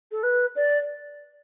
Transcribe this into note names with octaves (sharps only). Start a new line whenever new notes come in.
A4
B4
D5